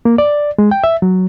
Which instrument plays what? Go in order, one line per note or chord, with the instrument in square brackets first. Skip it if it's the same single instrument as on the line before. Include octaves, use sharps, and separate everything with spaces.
[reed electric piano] A#3
D5
G#3
G5
E5
F#3